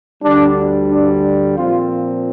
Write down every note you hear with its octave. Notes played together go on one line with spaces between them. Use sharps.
D2 D3 G3 D4
D4
A#2 F3 C4 F4